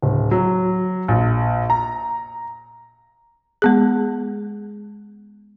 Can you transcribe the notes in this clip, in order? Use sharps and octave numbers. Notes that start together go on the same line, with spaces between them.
D1
F#3
A#1
A#5
G#3 B3 G#4